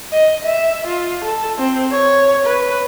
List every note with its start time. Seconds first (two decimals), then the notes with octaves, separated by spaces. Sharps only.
0.12 D#5
0.44 E5
0.87 F4
1.25 A4
1.59 C4
1.92 C#5
2.46 B4